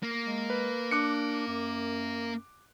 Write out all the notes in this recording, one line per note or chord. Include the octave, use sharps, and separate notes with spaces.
A#3
G#3
B4
D4 D6 F#6 C#7
F#2